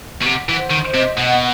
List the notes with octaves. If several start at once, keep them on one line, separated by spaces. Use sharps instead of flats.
B2
C3 F#5
E3
C5
D#3
D#5
C3
B2 F#5